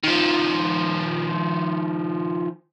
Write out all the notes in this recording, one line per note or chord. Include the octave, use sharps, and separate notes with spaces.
D#3 F3